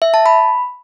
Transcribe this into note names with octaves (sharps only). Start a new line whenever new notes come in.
E5
A5
B5